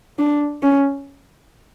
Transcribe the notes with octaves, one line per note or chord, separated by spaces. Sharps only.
D4
C#4